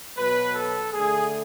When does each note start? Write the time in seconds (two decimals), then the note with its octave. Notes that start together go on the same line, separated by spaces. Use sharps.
0.17 B2 F#3 B3 B4
0.55 A4
0.93 D3 A3 G#4